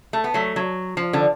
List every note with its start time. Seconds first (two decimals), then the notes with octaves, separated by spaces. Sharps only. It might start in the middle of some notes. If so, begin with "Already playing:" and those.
0.13 A3
0.24 B3
0.34 F#3 A3
0.56 F#3
0.97 F3
1.13 D3